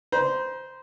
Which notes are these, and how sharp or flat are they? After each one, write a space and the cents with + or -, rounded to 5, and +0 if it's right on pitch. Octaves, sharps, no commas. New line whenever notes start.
C5 -10 A#5 +40